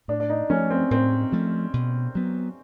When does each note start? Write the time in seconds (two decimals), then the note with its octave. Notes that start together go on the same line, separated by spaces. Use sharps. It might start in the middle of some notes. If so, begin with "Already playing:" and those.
0.08 A2 D4
0.20 D4
0.30 D#4
0.50 F3 A3 C#4
0.70 C4
0.91 A2 C4
1.32 F3 A3
1.74 B2
2.15 F#3 B3